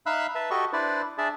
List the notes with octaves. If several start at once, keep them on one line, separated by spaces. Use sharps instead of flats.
D#4 E5 F5 B5 E6 F#6
B4 E5 A5
F#4 G4 A4 D#5 C#6
D4 E4 B4 C5 D5
D4 G#4 D5 E5 A5